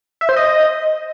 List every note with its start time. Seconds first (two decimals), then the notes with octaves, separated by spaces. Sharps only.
0.21 E5
0.29 C5
0.36 D#5